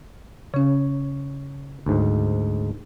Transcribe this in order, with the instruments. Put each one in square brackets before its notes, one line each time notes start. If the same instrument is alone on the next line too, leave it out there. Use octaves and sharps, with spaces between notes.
[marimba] C#3 C#4 [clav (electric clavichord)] C#5
[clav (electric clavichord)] D2 G#2